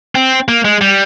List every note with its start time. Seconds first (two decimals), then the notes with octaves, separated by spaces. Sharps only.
0.15 C4
0.48 A#3
0.65 G#3
0.81 G3